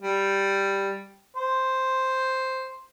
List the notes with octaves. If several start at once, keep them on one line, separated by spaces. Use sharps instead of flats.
G3
C5